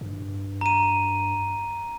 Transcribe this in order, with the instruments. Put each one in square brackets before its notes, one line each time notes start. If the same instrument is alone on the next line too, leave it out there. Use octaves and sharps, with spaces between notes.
[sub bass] G2
[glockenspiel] A#5 D#7